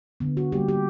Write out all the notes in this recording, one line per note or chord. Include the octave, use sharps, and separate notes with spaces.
D3 B3
F#4
G3 A#3 G4
G4